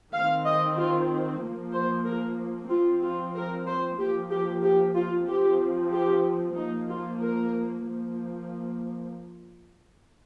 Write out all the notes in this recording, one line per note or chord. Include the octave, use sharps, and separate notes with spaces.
D#3 C4 F5
D#5
F4
F3 A#3
C5
A#4
F3 C4 F4
F4
A#4
C5
F3 A#3 G4
G4
G4
F4
F3 C4 G4
G4
F3 A#3 D#4
F4
A#4
F3 A#3